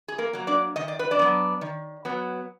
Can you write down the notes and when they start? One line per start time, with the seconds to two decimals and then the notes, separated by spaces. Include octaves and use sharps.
0.08 G#4
0.18 A#3 A#4
0.33 F#3 A#3
0.47 D4 D5
0.76 D#3 D#5
0.88 D5
0.99 B4
1.11 D4 D5
1.19 F#3 B3
1.61 D#3
2.05 F#3 B3